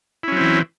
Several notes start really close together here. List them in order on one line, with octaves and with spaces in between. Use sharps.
E4 C#4 F#3 C4 E3